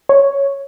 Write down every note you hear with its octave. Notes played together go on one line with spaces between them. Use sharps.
C#5